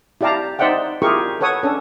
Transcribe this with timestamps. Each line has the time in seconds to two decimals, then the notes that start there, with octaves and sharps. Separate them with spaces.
0.21 E4 G4 D5 F5 A5 A#5
0.59 D#4 C5 D5 E5 F#5 G5
1.02 E4 F4 G4 G#4 A#4 C#6
1.41 A4 B4 C#5 F#5 D#6
1.63 C#4 D4 A4